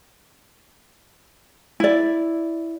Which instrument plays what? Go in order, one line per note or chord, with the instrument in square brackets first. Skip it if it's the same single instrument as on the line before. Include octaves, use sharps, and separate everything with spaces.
[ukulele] E4 D5